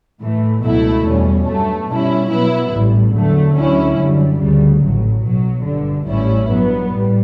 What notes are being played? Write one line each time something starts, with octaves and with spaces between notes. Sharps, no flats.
A2 E3 A3
C#2 B2 F#3 A3 E4
E2 B2 G3 C#4
G2 F#3 A3
B2 G3 C#4 E4
B2 F#3 B3 E4
A1 A2 G3
E2 D3 F#3 A3
D2 D3 F#3 C#4 E4
F#2 D3 G3
D2 C#3 G3
A1 A2 F#3
B1 B2 F#3
G1 G2 D3
A1 A2 G3 C#4 E4
G2 F#3 B3
A2 G3